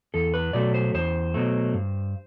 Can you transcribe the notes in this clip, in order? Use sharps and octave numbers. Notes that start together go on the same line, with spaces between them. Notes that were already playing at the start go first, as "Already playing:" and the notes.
E2 A4
B4
B2 F#3 A3 D5
C5
E2 C5
B2 F#3 A3
G2